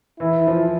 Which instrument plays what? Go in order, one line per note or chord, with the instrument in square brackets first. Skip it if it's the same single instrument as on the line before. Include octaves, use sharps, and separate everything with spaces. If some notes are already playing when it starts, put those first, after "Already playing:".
[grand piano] E3 [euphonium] E4
[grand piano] F3